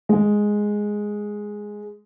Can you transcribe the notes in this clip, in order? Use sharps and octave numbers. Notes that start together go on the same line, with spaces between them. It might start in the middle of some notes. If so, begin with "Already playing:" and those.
G#3